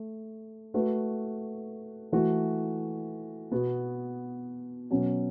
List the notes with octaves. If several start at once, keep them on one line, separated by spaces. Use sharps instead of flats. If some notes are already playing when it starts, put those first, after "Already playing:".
Already playing: A3
A3 F#4 B4
E3 A3 F#4
B2 B3 F#4
B2 F#3 C#4